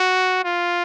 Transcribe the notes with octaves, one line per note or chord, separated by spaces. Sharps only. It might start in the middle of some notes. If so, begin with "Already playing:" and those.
Already playing: F#4
F4